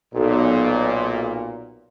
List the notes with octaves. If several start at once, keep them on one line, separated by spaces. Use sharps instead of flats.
B1 A#2